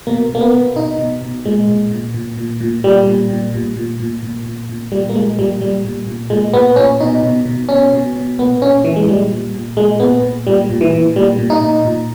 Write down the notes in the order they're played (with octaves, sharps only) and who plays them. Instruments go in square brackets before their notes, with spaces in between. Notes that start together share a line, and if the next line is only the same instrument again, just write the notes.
[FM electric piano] B2 A#3
B2
A#3
B3
B2
B2 D#4
B2
B2
A#2 G#3
A#2
A#2
A#2
A#2
A#2
A#2 G3
A#2
A#2
A#2
A#2
A#2
A#2
A#2
A#2
A#2 G3
A#3
A#2 G#3
A#2 G3
A#2 G3
A#2
A#2
A#2 G#3
A#2 B3
A#2 C#4
B2 D#4
B2
B2
B2 C#4
B2
B2
A#2 B3
A#2 C#4
A#2 E3
G#3
A#2 G3
A#2
A#2
A#2 G#3
A#2 B3
A#2
A#2 G3
A#2
E3
A#2
A#2 G3
A#2
D#4
A#2
A#2